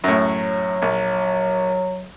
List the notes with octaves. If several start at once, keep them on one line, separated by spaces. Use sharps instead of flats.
F#2 A2 F#3
A#1